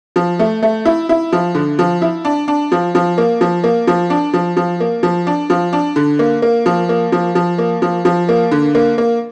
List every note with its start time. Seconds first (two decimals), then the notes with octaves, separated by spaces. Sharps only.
0.16 F3
0.39 A3
0.63 A3
0.85 E4
1.09 E4
1.32 F3
1.55 D3
1.79 F3
2.02 E4
2.25 D4
2.48 D4
2.72 F3
2.95 F3
3.18 A#3
3.41 F3
3.64 A#3
3.87 F3
4.10 D4
4.34 F3
4.57 F3
4.80 A#3
5.03 F3
5.27 D4
5.50 F3
5.73 D4
5.96 D3
6.19 A#3
6.42 A#3
6.66 F3
6.89 A#3
7.12 F3
7.35 F3
7.58 A#3
7.82 F3
8.05 F3
8.29 A#3
8.52 D3
8.75 A#3
8.98 A#3